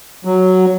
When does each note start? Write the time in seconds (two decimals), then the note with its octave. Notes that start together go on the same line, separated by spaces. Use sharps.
0.25 F#3